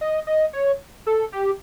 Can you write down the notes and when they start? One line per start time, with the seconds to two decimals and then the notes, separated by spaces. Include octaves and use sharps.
0.01 D#5
0.27 D#5
0.53 C#5
1.06 A4
1.32 G4